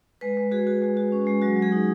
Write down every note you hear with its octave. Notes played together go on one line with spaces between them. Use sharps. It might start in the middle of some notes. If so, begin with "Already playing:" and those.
G#3 B4
G#3
F#4 G#4
F#4
G#3
F#4
C#4
G#3
F#3 F#4
F#3
G#4
D#4